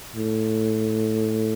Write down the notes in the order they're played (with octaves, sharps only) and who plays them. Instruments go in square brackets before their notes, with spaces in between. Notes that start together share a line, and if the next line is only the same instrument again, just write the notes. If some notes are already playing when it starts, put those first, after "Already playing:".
[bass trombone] A2